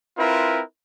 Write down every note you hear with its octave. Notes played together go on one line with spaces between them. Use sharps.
C4 E4 F4 A#4 B4